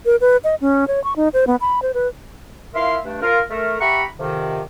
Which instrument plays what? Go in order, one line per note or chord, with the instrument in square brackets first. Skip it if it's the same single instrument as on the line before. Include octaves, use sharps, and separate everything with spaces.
[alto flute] A#4
B4
D#5
C#4
C#5
C#6
D#4
C5
B3
B5
C5
B4
[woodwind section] E4 F4 A#4 E5 F5 C6
G2 A3 D4
F4 A#4
A3 A#4
G4 E5 F#5 A#5 B5 C#6
F2 C3 D#3